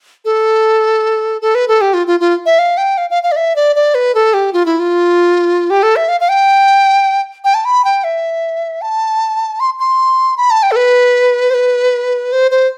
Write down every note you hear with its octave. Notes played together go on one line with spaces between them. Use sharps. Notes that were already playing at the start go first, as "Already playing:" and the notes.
A4
A4
B4
A4
G4
F4
F4
F4
E5
F5
G5
F5
F5
F5
D5
E5
D5
D5
B4
A4
G4
F4
E4
F4
G4
A4
E5
F5
F5
G5
G5
A5
B5
G5
E5
A5
C6
C6
B5
A5
G5
A4
B4
C5
B4
C5
C5